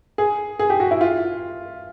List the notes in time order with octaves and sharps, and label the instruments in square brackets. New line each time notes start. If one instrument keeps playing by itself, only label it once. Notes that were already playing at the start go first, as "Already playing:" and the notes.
[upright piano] G#4
G#4
G4
F#4
E4
F4